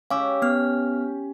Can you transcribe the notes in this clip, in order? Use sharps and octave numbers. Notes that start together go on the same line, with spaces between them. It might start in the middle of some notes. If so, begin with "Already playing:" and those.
C#4 G4 F5 D6 E6
B3 F6